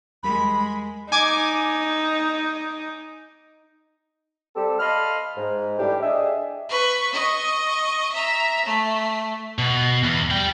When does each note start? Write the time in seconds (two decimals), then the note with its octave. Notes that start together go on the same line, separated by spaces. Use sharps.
0.23 E2 G3 G#3 A#4 B5
1.12 D#4 G#5 D6 G#6
4.55 G3 C4 G4 A4
4.79 D#5 F5 A5 B5 C6 F6
5.37 G#2
5.79 A2 E3 G3 D4 G4
6.01 D4 G4 G#4 D#5 E5
6.69 B4 C#6
7.13 D#5 C#6
8.12 E5 A#5
8.66 A3
9.59 B2
10.04 E2
10.30 G3 G5